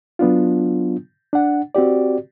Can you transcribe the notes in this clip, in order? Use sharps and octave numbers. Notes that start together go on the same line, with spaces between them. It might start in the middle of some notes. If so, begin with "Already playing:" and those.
F#3 B3 D4 F4
D4 F#5
C4 F#4 G4 D5